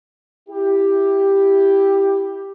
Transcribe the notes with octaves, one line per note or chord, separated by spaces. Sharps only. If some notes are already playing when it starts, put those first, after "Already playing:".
E4 G4